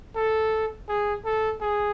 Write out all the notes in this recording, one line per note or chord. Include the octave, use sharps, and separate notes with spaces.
A4
G#4
A4
G#4